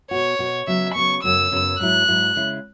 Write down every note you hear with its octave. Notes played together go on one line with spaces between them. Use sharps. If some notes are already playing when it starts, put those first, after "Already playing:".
B2 B3 F#4 C#5
B2 B3 F#4
C#3 F#3 B3 E5
C#3 F#3 B3 C#6
F#2 C#3 F#3 B3 E6
F#2 C#3 F#3 B3
G#2 F#3 E4 F#6
G#2 F#3 E4
C#3 G#3 E4